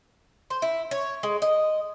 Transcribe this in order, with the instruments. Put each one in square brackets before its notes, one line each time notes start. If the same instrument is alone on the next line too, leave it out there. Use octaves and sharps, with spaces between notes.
[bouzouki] C5
E4
C#5
G#3
D#5